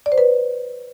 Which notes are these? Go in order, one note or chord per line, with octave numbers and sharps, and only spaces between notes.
D5
C5
B4